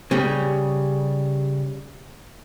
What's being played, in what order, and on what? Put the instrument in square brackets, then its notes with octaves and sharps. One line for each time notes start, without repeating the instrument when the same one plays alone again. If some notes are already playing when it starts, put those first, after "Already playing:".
[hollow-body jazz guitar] C#3 G3 C#4